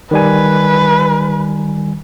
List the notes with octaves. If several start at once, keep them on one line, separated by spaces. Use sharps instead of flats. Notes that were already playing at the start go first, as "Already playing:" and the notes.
D#3 G3 B4 G#5